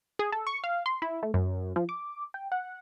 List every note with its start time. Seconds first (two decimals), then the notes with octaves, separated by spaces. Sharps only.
0.19 G#4
0.32 A4
0.47 C#6
0.64 F5
0.86 C6
1.02 E4
1.23 A3
1.34 F#2
1.76 F3
1.89 D6
2.34 G5
2.52 F#5